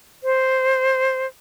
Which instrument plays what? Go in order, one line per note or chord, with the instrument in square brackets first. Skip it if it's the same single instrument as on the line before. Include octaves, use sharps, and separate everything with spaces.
[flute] C5